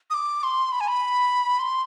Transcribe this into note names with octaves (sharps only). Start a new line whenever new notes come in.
D#6
D6
C6
B5
G#5
B5
C6